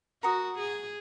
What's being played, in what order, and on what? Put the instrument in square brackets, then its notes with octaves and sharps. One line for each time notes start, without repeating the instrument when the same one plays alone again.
[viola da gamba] F#4 [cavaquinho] A#4 F#5 D#6
[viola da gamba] G#4